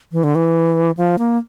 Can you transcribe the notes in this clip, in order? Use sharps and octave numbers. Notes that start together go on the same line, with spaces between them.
E3
D3
E3
F3
A#3